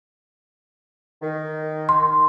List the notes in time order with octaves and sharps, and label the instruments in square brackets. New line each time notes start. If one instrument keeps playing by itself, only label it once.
[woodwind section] D#3
[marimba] C6